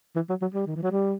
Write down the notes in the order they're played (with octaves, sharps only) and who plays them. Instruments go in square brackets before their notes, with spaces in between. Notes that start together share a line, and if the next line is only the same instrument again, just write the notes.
[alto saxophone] E3
F#3
F#3
G3
D#3
E3
F#3
G3